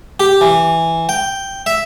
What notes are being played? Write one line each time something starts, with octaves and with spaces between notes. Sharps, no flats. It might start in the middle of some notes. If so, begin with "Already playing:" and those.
G4
E3
G5
E5